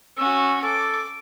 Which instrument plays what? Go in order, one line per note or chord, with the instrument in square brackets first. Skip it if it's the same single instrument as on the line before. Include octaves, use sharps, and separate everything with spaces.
[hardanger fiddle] C#4 F#4 [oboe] E6
[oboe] A4 [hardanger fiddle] D6